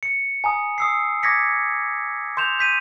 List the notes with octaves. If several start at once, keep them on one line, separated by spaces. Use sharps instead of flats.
C#7
G#5 A#5 D#6
D#6 E6 C7
D6 D#6 G#6 A#6 B6 C#7
C6 G6 E7 F7
G6 B6 D#7